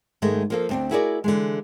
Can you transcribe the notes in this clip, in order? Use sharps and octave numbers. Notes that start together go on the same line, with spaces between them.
G#2 D#3 G#3 A3
F3 A#3 A4
D2 C4 D4
E4 F#4 G#4 A#4 C#5 D5
D3 E3 G#3